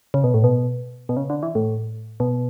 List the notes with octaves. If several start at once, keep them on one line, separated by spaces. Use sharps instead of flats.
C#3
B2
A2
B2
B2
C#3
D3
E3
A2
B2